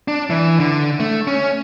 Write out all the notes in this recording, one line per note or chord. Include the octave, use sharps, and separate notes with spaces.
D4
E3
D3
A3
C#4